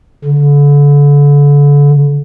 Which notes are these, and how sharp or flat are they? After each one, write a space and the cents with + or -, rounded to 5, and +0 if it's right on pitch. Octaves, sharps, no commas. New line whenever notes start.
D3 -35